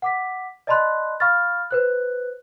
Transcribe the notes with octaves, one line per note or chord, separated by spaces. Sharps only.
F#5 D6 B6
D5 D#5 A5 B5 C6 F#6
F5 B5 C#6 F6 A6
B4 C5 F#6